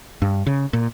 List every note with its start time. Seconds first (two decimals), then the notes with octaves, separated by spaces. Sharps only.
0.22 G2
0.46 C#3
0.73 A#2